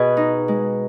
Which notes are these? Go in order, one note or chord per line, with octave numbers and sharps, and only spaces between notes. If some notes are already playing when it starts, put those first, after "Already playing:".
Already playing: B2 G#4 B4 D#5
D#4
G#3